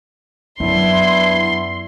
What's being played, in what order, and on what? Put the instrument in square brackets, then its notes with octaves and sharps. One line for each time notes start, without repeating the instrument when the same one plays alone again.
[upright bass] F#2 [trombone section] B3 D4 E4 [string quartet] C6